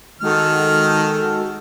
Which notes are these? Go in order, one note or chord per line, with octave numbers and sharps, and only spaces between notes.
D#3 G#3 F#4 A4 F6